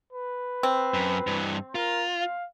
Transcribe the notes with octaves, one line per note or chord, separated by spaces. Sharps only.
B4
C4
F#2
G2 E3
F4 A#4
F5